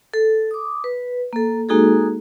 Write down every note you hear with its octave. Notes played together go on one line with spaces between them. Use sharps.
A4
D6 D#6
B4
A#3 A4
G#3 A#3 D#4 F#4 G#4 A4